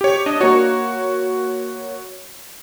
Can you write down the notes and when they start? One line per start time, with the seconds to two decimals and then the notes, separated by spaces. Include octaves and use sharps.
0.01 G4 C#5
0.26 D4 D#5
0.41 A#3 F#4 C#5